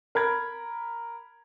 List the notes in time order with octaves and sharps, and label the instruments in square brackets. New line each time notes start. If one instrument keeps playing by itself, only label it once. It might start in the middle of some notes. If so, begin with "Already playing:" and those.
[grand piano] A#4 B5 G#6